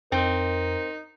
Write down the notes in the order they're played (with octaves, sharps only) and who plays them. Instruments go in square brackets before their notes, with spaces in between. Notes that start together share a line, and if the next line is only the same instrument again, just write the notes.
[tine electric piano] F2 [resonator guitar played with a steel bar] C4 [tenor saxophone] D#4 [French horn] A#4